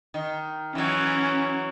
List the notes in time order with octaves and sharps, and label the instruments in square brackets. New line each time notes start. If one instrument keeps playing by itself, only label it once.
[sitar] D#3
[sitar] E3 F#3 [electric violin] C#4